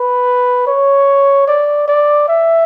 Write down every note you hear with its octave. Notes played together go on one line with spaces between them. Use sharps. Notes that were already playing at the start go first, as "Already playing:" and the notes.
Already playing: B4
C#5
D5
D5
E5